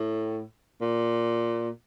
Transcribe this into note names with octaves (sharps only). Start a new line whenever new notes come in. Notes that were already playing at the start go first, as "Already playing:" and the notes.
Already playing: A2
A#2